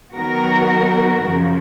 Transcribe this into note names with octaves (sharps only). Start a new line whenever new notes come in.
D#3 F#3 B3 F#4 A#4
F#2 C#3 F3